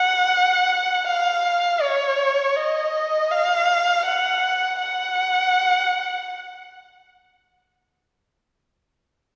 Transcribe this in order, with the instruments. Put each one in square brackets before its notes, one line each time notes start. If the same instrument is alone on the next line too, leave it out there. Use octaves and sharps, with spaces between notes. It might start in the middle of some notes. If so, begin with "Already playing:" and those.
Already playing: [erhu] F#5
F5
C#5
D#5
F5
F#5
F#5